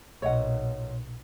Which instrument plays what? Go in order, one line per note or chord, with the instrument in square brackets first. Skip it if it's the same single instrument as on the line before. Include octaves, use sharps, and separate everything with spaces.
[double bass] B1 A#2 [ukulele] C#5 D#5 F#5